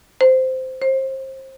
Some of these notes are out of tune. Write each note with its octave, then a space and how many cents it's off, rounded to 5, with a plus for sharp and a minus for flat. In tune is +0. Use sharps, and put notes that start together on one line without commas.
C5 -10
C5 +30